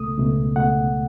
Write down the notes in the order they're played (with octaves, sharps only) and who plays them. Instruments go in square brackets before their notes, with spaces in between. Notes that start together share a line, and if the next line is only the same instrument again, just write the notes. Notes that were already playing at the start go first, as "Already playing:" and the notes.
Already playing: [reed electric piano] C#2 B2 A3 D#6
C#2 B2 A3
C#2 B2 A3 F#5